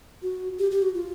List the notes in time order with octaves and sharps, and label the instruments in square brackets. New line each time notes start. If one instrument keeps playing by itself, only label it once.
[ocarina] F#4
G4
G4
F#4
F4